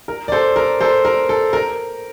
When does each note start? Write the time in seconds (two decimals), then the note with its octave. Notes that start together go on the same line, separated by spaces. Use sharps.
0.08 A#4
0.28 D5
0.32 A4 C5
0.56 A#4
0.81 A4 C5
1.05 A#4
1.29 A4
1.53 A#4